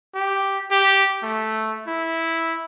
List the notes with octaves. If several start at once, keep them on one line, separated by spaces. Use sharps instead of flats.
G4
G4
A3
E4